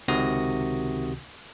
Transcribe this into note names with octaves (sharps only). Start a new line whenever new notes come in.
C#2 C3 D#3 F#4 D#6 A#6